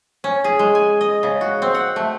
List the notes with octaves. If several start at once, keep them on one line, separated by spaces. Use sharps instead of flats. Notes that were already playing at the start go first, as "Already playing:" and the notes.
C#4
G#4
G#3
G#5
D#5
C#3
F#4
C4
F#5
A3